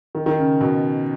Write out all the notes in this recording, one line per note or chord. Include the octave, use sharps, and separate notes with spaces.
D#3
D#3
C#3
B2